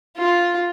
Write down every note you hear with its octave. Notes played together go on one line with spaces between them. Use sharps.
F4